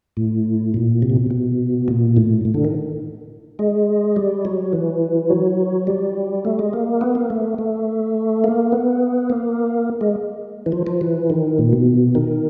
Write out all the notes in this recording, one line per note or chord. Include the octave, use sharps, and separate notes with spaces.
A2
A#2
C3
A#2
B2
B2
A#2
A2
A2
D3
D#3
G#3
G3
F#3
E3
F#3
G3
A3
G#3
A#3
B3
A#3
A3
A3
A#3
B3
A#3
G#3
E3
F3
F3
E3
D#3
A#2
B2
D#3